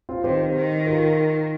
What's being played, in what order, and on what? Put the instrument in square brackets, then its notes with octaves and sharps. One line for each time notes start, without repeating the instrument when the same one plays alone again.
[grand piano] C4 F4
[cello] D#3 [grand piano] G4 C5
[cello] D#3
[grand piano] F4 A#4